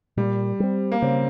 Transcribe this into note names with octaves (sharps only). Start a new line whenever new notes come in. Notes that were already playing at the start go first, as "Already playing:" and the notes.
A#2 G3
G3 C4
A#3
C#3 C4